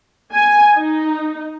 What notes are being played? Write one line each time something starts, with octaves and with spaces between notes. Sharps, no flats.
G#5
D#4